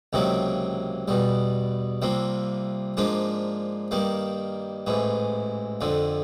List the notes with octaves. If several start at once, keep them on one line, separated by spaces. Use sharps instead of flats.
C#2 C3 D#3 F#3 A#3
E2 B2 G3
C2 C3 F3 A#3
G#2 F3 A#3 D4
G2 D#3 G3 A#3
A1 G#2 E3
F2 D3 F3